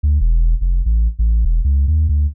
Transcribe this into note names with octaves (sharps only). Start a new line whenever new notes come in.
D2
E1
F1
A1
A1
E1
C#2
D#2
D2